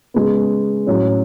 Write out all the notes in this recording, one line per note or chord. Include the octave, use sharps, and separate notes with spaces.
C#3 G#3 B3
A2 F#3 C#4